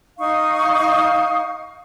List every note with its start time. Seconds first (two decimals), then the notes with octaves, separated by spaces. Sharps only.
0.18 D#4 F5 C#6 D#6